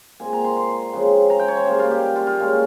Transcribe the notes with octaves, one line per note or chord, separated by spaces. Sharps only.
A#2 G#3 C4 G#5
A#5
C6
C6
C#3 F3 G#3 C4
A#5
G5
C#5
C5
C#3 G3 A#3
F4
G4
F4
F4
A#2 G#3 C#4